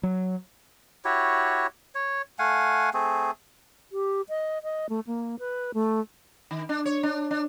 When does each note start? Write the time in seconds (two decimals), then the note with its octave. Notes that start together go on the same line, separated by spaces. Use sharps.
0.03 F#3
1.05 E4 F#4 G4 C#5
1.95 C#5
2.39 A3 F5 F#5 G#5
2.94 A3 C4 G#4
3.92 G4
4.29 D#5
4.63 D#5
4.89 A3
5.07 A#3
5.39 B4
5.74 A3
6.51 D#3
6.69 D4
6.85 C#5
7.03 D4
7.31 D4